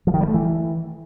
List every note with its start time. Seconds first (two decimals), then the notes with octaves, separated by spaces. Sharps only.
0.07 F3
0.14 D#3
0.21 G3
0.27 A3
0.34 E3